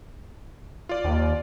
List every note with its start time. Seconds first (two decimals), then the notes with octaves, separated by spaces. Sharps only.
0.89 F4 D5
1.04 D#2